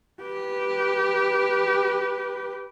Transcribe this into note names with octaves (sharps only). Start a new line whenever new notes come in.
G4 B4